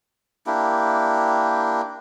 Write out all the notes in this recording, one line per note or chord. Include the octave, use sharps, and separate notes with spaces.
A#3 D4 E4 G4